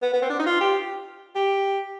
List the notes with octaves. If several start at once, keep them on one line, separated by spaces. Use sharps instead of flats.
B3
B3
C4
D4
D#4
F4
G4
G4